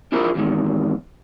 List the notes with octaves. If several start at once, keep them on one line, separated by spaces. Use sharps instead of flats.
D4 E4 F4 G#4 A#4 C5
E2 G#2 D#3